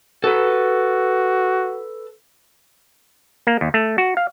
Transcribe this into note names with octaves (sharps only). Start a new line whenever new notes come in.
F#4 A4 B4
A#3
D#2
A3
F#4
F5